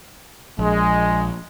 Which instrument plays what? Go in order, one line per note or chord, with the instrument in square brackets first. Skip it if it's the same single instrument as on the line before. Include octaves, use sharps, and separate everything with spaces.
[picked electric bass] A#1 [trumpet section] G#3